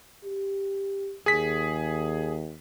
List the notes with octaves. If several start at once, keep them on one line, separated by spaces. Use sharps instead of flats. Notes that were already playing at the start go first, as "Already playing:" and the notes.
G4
D#2 G#4 B6